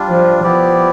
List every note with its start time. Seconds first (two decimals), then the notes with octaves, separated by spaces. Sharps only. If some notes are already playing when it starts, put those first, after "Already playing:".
Already playing: G3 D4 F4
0.09 F3
0.43 F3 B3 E4 G4 D5